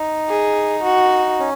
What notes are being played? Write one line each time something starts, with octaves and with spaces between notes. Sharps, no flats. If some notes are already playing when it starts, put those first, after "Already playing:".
Already playing: D#4
G#4
F#4
C#4